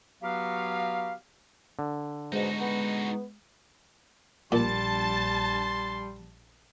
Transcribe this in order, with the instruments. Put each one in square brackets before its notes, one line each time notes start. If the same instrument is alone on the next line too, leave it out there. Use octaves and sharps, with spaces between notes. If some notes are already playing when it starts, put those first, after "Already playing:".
[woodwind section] F#3 B3 F#4 G4 F5
[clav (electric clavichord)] D3
[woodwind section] G#2 B2 [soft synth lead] G#3 [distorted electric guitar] D#4 F#4
[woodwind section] B3
[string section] A#1 A5 A6 [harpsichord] A#2 [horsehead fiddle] G3 [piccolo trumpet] C6